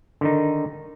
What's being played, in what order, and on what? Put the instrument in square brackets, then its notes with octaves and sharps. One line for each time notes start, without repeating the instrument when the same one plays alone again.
[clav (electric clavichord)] D3 D#3 D#4